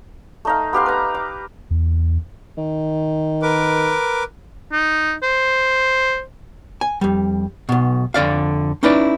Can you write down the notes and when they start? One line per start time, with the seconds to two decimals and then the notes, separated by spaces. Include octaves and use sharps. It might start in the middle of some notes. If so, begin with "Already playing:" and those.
0.45 A3 D#4 F5
0.73 B3 G4 F5 C6
0.86 B4 A#5
1.14 D6
1.71 E2
2.57 D#3
3.42 A#4 B4 D6
4.72 D#4
5.23 C5
6.81 G#5
7.01 F2 G3
7.69 B1 B2
8.14 F2 D3 D5 F5
8.83 C#4 D#4 E4 B4 D5